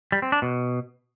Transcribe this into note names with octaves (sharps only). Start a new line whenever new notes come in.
G3
C4
D4
B2